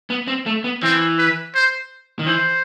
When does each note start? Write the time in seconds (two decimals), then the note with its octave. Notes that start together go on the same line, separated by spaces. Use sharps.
0.10 B3
0.28 C4
0.46 A3
0.64 B3
0.82 E3 C4
1.18 B4
1.55 C5
2.19 D#3
2.26 E3 C5